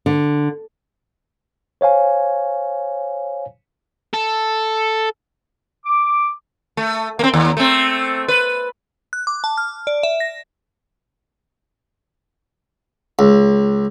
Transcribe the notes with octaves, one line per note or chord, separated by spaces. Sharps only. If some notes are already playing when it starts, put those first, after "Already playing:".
D3
C5 C#5 F5 G#5
A4
D6
A3
A#3 C4
D#2
A3 C4
B4
F#6
D6
A5
F6
D5
E5
A#6
C#2